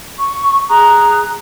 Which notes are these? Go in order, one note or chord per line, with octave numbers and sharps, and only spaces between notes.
C#6
G#4 A#5 D#6 F#6